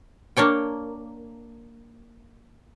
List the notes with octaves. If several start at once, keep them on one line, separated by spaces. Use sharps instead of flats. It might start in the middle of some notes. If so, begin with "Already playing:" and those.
A#3 D4 C#5 G5